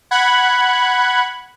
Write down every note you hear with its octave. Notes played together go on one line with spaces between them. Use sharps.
F#5 B5 F#6 G#6